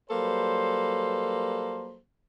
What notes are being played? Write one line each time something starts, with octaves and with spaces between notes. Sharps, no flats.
F#3 G3 A#3 A4 B4 C5